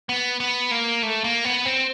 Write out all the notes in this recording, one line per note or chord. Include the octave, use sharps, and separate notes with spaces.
B3
B3
A#3
A3
A#3
B3
C4